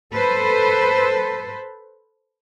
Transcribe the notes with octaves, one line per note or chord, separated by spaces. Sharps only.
A4 B4 C5